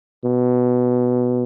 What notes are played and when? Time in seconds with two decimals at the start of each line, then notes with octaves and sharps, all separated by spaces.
0.24 B2